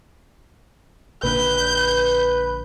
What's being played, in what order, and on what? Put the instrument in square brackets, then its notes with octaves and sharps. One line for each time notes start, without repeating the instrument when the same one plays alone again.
[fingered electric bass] A#1 A#2 D3 [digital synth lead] B4 [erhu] G6